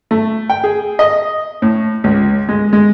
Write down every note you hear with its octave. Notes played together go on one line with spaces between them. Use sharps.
A3
G5
G#4
D#5
A2
C#2
G#3
G#3